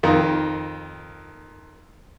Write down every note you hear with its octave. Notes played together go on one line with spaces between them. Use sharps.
F2 D#3